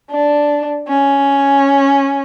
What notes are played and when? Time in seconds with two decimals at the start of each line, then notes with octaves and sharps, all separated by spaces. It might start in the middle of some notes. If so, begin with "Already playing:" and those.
0.11 D4
0.88 C#4